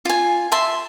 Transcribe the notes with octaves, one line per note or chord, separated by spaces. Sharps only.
F4 G#5
E5 A5 C6